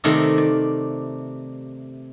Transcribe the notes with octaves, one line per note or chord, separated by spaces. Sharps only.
C3 D#3 A3 A#4 D5 E5
D5